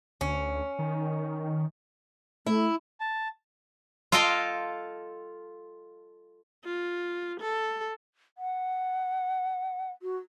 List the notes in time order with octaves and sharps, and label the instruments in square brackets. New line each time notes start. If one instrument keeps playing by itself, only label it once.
[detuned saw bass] D2 [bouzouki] C#4
[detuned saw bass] D#3
[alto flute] A3 [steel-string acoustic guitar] E4
[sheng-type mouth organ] A5
[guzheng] F4 A4 D#5 F5 G5 C6
[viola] F4
A4
[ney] F#5
F#4